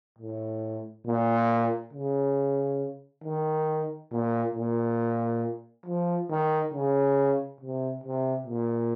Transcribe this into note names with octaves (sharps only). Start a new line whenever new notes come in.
A2
A#2
C#3
D#3
A#2
A#2
F3
D#3
C#3
C3
C3
A#2